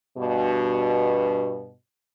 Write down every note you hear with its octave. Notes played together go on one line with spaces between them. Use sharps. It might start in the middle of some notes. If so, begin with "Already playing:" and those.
G2 B2